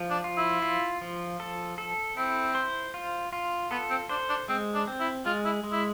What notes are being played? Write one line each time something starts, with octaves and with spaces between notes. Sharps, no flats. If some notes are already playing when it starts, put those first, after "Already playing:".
Already playing: F3
D4
F4
E4
F4
F3
A4
A4
C4 E4
C5
F4
F4
B3 A4
C4
D4 C5
D4
G#3 C4
D4
C4
E4
G#3 F4
E4
G#3
E4